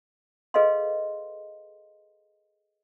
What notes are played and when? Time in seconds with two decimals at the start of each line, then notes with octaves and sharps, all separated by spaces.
0.54 G#4 A4 B4 D#5 F5 C6